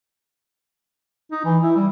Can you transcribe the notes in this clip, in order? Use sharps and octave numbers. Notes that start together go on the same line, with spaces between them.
D#4
E3
E4
G3